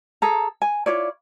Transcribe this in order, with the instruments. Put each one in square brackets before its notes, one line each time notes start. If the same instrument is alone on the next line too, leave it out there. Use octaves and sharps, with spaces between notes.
[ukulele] G#4 A4 A#5
G#5
E4 F4 C#5 D5